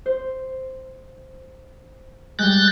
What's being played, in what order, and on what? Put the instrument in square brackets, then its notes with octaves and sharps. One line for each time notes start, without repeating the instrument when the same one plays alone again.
[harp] C5
[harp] G3 G#3 [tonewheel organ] F#6 G6 A6